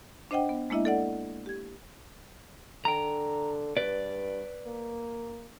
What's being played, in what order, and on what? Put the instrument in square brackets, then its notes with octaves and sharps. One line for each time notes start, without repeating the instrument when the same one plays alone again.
[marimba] D4 C5 D#5 F#5 G5
B3
G#3 A#3 D4 E4 D#5 E5
A4 D5 F#5
G4 G#6
[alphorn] D3 [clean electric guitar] G5 A#5
[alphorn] G2 [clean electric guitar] B4 D5
[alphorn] A#3